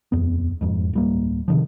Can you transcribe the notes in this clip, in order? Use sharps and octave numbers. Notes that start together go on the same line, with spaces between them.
D#1 F2 B3
E1 F2 G#2
D1 G3 A#3
C3 D#3 F3